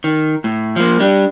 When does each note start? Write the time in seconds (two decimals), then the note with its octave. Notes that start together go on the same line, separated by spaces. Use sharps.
0.04 D#3
0.44 A2
0.76 F3 A#3
1.00 G3 D4